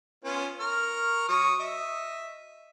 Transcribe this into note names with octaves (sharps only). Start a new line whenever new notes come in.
B3 C#4 F4
A#4 C#6 F6
F#3 C#6 D#6
D#5 E5